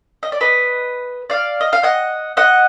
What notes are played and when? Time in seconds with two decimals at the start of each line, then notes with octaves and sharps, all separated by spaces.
0.23 D#5
0.32 D5
0.41 B4 D#5
1.30 D5 F5
1.61 D#5
1.73 F5
1.83 D#5 F#5
2.37 D#5 F#5